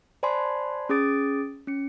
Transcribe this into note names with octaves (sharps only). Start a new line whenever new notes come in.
C5 D5 G#5 A5 B5 C6
C#4 G#4 D6 D#6 A6 D7
C#4 C#7